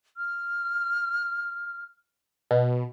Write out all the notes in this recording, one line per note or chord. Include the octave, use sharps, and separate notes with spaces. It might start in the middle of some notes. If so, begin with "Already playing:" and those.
F6
B2